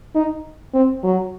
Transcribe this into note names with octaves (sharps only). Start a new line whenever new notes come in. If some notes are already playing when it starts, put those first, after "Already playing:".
D#4
C4
F#3